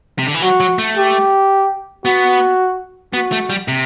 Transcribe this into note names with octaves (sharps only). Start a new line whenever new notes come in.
C3
D3
E3
F#3 F#4
F#3
A3
G4
B3 F#4
B3 F#4
A3
G3
C3